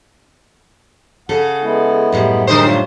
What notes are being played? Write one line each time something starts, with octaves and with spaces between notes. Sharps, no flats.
C#3 A4 F#5
G#3 B3 E4
F#2 A2 G3
D3 D#4 G#4 A#4 C5 D#5
D4 F4 C#5